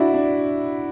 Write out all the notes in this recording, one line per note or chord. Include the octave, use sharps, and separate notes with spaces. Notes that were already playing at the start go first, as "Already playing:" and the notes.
Already playing: D4 E4 F#4
D4